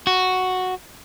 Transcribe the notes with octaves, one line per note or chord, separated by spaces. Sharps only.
F#4